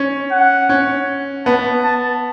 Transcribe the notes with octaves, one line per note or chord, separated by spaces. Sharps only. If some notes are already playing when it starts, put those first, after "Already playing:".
Already playing: C#4
F#5
C#4
B3 A5
A5